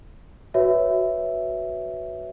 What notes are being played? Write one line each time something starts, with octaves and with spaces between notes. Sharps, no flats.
F#4 B4 C#5 E5